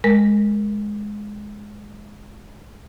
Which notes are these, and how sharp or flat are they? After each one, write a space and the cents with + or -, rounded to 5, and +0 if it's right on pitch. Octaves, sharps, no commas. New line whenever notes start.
G#3 +5 A#4 +0